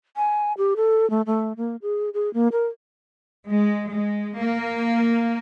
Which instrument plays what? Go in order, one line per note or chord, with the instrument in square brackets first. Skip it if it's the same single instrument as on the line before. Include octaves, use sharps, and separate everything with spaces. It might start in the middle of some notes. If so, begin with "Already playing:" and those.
[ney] G#5
G4
A4
A3
A3
A#3
G#4
G#4
A#3
A#4
[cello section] G#3
G#3
A#3